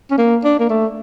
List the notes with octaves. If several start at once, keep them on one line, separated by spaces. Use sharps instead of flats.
C#4
A#3
D4
A#3
A3